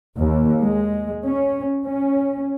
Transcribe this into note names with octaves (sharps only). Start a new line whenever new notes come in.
D#2
G#3
C#4
C#4